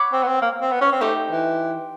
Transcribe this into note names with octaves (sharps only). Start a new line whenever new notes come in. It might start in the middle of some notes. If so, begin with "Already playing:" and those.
Already playing: C#5 F#5 B5 D6
C4
B3
C4
A#3
C4
B3
C#4
C4
A3 D#4 G4 C5
E3